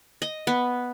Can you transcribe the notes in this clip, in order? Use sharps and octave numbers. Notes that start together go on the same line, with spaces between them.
D#5
B3